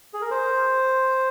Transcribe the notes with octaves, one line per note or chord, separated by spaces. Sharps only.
G#4
A#4
C5